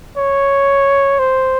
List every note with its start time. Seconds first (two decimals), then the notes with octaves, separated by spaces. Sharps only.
0.18 C#5
1.19 C5